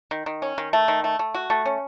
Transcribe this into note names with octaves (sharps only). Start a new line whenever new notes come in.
D#3
D#3
C#4
D#3
A3
D#3
A3
A3
F#4
A3
C#4